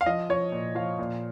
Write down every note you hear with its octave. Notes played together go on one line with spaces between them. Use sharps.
F5
F3 D#5
F3 C#5
A#2
F3 F5
A#2